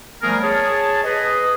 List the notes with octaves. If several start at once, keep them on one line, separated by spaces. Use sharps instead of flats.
F3 G3 A3 B3 G#4 A#4
G#4 C#5 A5
G#4 B4 D#5